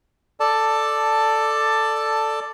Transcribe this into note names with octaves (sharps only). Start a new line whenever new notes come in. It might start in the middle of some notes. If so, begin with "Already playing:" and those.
A4 D5 A5